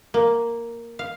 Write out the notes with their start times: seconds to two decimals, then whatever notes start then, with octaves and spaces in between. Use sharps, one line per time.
0.14 A#3
0.99 F5